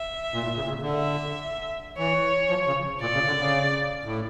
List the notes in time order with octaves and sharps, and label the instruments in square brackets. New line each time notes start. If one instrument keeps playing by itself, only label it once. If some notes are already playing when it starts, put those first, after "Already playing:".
Already playing: [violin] E5
[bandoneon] A#2
A2
C#3
A#2
C#3
D3
[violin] E5
[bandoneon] E3 [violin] C#5
[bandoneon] F3
C#3
[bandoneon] A#2 [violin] D5
[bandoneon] C#3
D3
C#3
A2